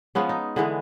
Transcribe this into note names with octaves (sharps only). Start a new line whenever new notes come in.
F3 G#3 B3 C#4
D#4
D3 E3 G#3 B3